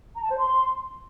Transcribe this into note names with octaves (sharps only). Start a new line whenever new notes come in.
A#5
A5
C5
C6